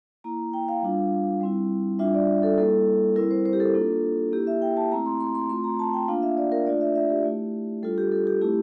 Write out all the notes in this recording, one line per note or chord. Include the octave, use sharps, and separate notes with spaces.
A#3 E4 A#5
G5
F5
G3 D4 F4
G3 C4 E4
G3 D4 F4 E5
D5
A4
G3 A#3 E4 A4
G3 C4 E4 A#4
C5
C5
G4
A4
A#3 D4 F4
A#3 E4 G4
E5
G5
A5
A3 C4 E4 A#5
C6
C6
C6
A3 C4 F4 C6
A#5
A5
G5
A#3 D4 F4 F5
E5
D5
A#4
A3 D4 F4 D5
E5
E5
G4
A3 E4
G3 D4 F4 A4
G4
A4
G4
A3 C4 E4 G4